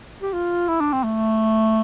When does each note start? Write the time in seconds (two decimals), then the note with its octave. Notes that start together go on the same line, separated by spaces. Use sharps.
0.22 G4
0.33 F4
0.68 E4
0.80 D4
0.93 C4
1.04 A3